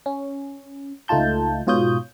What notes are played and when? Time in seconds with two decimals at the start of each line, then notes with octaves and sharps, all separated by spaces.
0.06 C#4
1.08 C#2 A3 D#4 F4 A5 G6
1.67 G#2 B2 F4 C#5 D#6 G6